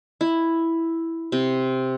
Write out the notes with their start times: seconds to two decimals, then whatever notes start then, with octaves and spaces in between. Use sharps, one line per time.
0.21 E4
1.32 C3